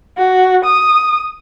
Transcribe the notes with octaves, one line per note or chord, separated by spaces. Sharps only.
F#4
D#6